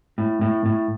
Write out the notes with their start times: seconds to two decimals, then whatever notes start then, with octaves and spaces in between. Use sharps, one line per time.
0.18 A2
0.41 A2
0.66 A2